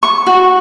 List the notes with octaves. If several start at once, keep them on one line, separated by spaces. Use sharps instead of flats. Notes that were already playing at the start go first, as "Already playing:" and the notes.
C#6
F#4